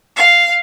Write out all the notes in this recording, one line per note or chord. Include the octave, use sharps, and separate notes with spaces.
F5